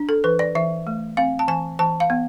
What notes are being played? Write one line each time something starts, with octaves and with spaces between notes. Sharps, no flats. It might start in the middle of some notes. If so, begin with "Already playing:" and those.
Already playing: D4
A4
E3 B4
D5
E3 E5
A3
C4 F5
A5
E3 G#5
E3 A5
F5
B3